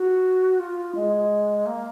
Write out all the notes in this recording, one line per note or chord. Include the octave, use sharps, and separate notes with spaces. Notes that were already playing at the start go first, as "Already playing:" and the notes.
Already playing: F#4
F4
G#3
A#3